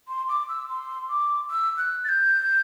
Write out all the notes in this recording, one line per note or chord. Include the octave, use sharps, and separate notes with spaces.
C6
D6
E6
C6
D6
E6
F#6
A6
G6